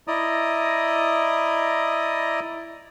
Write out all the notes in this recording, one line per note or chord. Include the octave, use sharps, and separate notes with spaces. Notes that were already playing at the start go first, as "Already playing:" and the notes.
E4 D5 D#5 A#5 D#6